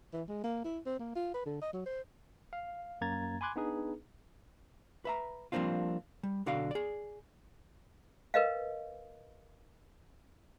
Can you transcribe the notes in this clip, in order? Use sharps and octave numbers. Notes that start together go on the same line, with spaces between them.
E3
G#3
A#3
E4
C4
A#3
F4
B4
D3
D#5
F#3
C5
F5
F#2 A#3 A#5 G#6 A6
G#5 B5 C6 D6 F#6 G#6
B3 D4 D#4 G#4 B4
B4 E5 A#5
F3 G3 A#3 C4 D4 F4
G3
B1 D3 F#4 D5 F5
G#4 D5
A#4 B4 D#5 F5